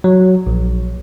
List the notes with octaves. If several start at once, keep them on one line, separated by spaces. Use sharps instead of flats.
F#3
A#1